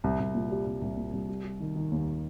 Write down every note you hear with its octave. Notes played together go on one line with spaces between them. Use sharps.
C2
C2
A#2
G3
C2
C2
A#2
C2
G3
G3
D#3
D#3
D#2